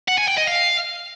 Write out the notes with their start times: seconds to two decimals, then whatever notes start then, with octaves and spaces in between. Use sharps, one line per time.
0.08 F#5
0.18 G#5
0.28 G5
0.37 D#5
0.47 F5